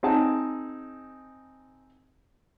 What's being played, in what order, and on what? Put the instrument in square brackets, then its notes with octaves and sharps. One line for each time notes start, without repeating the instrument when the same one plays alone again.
[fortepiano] C4 D#4 G#4 F#5 A5